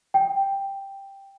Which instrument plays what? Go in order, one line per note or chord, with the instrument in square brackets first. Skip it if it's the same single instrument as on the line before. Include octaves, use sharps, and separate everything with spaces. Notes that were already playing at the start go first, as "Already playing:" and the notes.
[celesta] G5